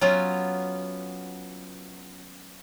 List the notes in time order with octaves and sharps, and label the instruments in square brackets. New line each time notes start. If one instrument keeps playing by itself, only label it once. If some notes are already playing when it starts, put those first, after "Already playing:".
[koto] F#3 B3 C#4 F4